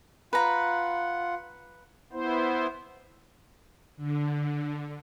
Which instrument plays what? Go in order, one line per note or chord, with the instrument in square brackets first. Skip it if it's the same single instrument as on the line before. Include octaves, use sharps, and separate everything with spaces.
[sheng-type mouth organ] F4 F#5 [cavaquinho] B4 A#5
[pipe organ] B3 E4 C5
[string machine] D3